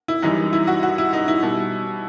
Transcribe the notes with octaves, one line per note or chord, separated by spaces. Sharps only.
E4
F#2 E3 G3 D#4
E4
F#4
F#4
E4
D#4
E4
B2 G3